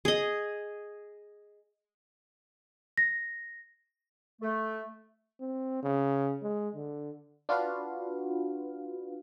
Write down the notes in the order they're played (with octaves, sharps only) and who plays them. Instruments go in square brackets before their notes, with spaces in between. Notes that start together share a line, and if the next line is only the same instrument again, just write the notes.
[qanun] G#4 D#5
[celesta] A#6
[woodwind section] A3
[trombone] C4
C#3
G#3
D3
[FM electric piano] D4 F4 F#4 B4 F5